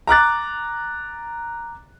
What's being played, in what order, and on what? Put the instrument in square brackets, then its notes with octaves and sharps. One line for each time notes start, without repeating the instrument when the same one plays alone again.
[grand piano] A#5 D6 F#6 A6